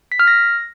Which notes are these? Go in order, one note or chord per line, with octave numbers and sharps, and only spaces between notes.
B6
F6
A#6